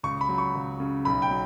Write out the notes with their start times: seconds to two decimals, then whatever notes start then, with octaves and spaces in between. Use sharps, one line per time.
0.03 C#2 C#6
0.21 B5
0.29 F#3
0.38 C#6
0.55 C#2
0.80 C#3
1.05 B1 B5
1.22 G5
1.31 F#3